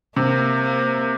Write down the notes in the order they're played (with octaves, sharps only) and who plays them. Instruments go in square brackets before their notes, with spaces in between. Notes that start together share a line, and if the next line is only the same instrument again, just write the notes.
[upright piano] C3 [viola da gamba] A#3
[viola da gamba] A#3